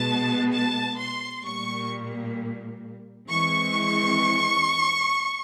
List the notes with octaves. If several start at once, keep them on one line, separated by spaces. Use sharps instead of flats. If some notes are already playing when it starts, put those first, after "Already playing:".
Already playing: B2 G#3 B3 A5
A5
C6
A#2 G3 A#3 C#6
E3 G#3 C4 C#6